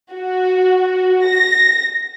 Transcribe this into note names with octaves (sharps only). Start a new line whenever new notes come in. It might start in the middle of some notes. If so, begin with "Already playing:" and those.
F#4
A#6